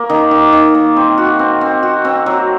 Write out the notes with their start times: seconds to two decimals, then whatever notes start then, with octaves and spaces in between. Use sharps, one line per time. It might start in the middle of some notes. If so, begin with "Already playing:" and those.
Already playing: A#3
0.10 D#3
0.31 D#3
0.53 D#3
0.75 A#3
0.96 C4
1.18 F#4
1.39 C4
1.61 C4
1.83 F#4
2.05 C4
2.26 F#3